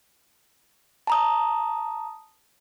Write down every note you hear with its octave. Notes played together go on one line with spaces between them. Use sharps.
A5 A#5 D#6